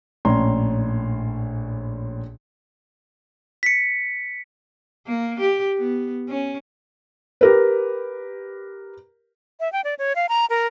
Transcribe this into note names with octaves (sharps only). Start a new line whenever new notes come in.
A#1 A2 C#4 D5 A#5 C6
B6 C#7
A#3
G4
B3
C#4
G4 A#4 B4
E5
G5
D5
C#5
F5
A#5
A#4